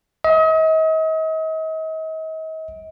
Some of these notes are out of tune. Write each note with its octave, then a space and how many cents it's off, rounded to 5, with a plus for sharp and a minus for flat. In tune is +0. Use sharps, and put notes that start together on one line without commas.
D#5 +40